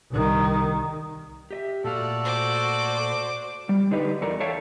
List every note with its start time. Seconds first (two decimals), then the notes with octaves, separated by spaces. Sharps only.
0.11 C2 D#3
1.51 G4 D#5 E5
1.84 A#2 A3 F#4 A4 D5 F5
2.24 C5 D6
3.69 G3
3.91 D3 D4 D#4 G4 B4 D5
4.21 E2 A4 A#4 D5
4.40 A4 C#5 E5 F5 G5 A5